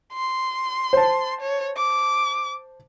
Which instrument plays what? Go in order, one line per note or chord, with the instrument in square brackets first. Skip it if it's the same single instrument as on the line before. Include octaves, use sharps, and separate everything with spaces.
[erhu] C6
[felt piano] C5 A5
[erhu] C#5
D6